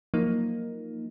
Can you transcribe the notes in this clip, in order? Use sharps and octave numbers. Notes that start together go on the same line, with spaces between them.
F3 F#3 A#3 D#4